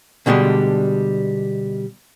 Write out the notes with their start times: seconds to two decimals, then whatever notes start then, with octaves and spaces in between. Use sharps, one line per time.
0.26 B2 D3 G3 G#3 D4